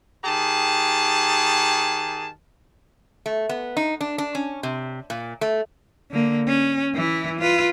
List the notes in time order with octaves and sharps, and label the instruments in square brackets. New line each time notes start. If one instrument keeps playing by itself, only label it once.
[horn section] D#3 G4 G#4 A5
[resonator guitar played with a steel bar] A3
B3
D#4
D4
D4
C#4
C3
A#2
A3
[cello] D3 A#3
C#4
E3 E4
F4 B4